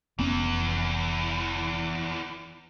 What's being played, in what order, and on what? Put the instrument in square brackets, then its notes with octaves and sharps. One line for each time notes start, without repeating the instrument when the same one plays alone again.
[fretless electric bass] F1 B3 C#4 [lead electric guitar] E2 E3